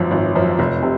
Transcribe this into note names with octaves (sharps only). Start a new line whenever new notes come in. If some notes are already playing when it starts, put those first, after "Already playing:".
Already playing: G#1 F#2 F3
G#1
F#2 F3
F1
C3